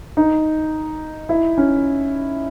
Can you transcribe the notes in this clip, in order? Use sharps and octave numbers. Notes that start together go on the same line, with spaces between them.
D#4
E4
C#4